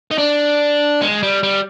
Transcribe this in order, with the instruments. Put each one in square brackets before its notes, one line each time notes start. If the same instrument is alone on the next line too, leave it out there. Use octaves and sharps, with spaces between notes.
[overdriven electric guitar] D#4
D4
G#3
G3
G3